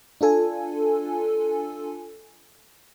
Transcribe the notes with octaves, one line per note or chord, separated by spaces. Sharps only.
D4 F4 A4 G#5